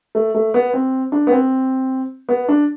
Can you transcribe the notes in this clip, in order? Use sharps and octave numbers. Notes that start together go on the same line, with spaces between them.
A3
A3
B3
C4
D4
B3
C4
B3
D4